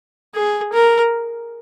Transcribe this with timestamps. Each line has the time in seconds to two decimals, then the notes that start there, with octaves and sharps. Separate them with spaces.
0.35 G#4
0.73 A#4